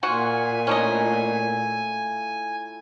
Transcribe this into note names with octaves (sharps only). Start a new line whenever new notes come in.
A#2 F4 F#4 F#5 G#5
A2 C#4 D4 E4 D#5 A#5